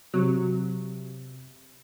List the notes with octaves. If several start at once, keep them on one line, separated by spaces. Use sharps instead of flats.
C3 F#3